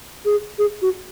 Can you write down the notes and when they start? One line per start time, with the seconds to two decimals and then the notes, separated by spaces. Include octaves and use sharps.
0.25 G#4
0.58 G#4
0.82 F#4